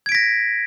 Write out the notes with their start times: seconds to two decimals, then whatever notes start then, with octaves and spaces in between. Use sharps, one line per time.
0.06 G#6
0.09 D7
0.12 B6
0.15 A#6